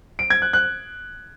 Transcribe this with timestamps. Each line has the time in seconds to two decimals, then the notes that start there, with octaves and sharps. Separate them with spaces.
0.19 D7
0.30 G#6
0.42 F#6
0.53 F#6